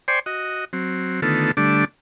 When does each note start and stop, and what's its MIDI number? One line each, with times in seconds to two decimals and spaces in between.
0.08 0.19 72
0.08 0.19 74
0.08 0.19 79
0.08 0.19 80
0.08 0.19 84
0.08 0.19 85
0.26 0.65 66
0.26 0.65 75
0.73 1.21 54
0.73 1.21 60
1.22 1.51 50
1.22 1.51 51
1.22 1.51 57
1.22 1.51 59
1.22 1.51 65
1.22 1.51 69
1.57 1.85 50
1.57 1.85 55
1.57 1.85 57
1.57 1.85 62
1.57 1.85 86